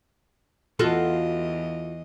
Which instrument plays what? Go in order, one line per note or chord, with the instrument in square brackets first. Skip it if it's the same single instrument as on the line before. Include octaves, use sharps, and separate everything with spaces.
[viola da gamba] E2 D#5 [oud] F4 F#4 A4